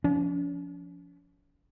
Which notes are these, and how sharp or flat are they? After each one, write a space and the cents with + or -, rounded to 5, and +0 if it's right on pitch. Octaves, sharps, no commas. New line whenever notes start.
F3 +0 C#4 +45